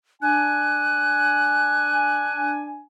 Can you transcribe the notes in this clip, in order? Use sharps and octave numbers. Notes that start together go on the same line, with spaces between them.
D4 G#5 F#6